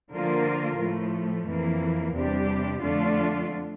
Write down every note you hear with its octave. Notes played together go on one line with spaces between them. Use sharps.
D3 F3 A#3 F4 A#4
A2 F3 A3
F2 E3 A#3
E2 C3 G3 D4 G4
F2 D3 A3 D4 F4